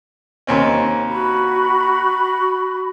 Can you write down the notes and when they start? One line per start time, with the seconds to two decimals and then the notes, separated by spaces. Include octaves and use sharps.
0.47 D#2 C4 C#4
1.08 F#4 B5